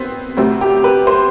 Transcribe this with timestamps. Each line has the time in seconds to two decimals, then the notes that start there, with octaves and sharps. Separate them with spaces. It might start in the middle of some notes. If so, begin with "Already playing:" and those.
Already playing: B3 C4
0.37 D2 C3 F#3 A3 C4
0.61 G4
0.84 B4
1.07 C5